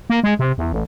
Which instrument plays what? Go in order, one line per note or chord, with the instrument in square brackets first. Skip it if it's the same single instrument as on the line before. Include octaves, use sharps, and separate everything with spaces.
[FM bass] A#3
G#3
C3
E2
A1